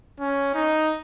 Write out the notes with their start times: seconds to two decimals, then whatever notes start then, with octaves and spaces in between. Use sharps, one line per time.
0.20 C#4
0.54 D#4